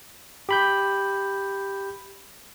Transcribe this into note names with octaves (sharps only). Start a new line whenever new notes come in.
G4 B5 G6